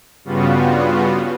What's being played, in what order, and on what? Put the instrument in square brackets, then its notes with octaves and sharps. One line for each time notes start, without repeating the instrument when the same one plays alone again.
[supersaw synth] G2 C#3 G3 B3 F4 F#4